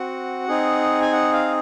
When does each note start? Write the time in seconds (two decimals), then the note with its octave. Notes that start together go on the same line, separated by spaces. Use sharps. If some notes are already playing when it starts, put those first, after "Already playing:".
Already playing: C4 F#4 F#5
0.48 C4 D#4 G#4
1.02 G#5
1.12 F#5
1.33 F5